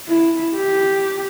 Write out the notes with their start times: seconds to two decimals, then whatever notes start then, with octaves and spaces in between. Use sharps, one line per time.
0.09 E4
0.56 G4